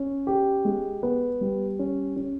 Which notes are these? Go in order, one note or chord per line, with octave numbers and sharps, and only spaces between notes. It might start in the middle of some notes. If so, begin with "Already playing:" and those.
Already playing: C#4
G4
G#3
B3
G3
C#4
C#4